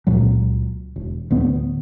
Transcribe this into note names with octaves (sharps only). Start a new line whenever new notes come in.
C#2 A#2 F#3
E1
D2 A2 B3